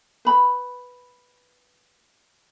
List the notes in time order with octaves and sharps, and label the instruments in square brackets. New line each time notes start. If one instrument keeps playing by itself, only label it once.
[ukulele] B4 B5